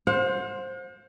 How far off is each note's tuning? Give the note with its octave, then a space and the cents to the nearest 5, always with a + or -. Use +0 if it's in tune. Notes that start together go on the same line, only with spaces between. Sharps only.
C5 +15 F#5 -45